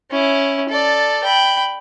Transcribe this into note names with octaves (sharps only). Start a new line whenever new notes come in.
C#4 E4
A4 D5
G5 B5